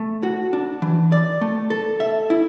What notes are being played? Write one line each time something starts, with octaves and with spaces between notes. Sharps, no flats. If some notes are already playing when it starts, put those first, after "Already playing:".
Already playing: A3
F#4
D4
E3
D5
A3
A4
E5
E4